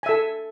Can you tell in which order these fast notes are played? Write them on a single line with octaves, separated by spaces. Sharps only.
G#5 E5 A4